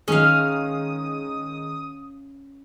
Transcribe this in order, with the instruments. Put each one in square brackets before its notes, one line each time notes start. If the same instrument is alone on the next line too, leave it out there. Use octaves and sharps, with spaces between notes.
[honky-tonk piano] D#3 G#3 [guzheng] C#4 F5 [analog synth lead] D#6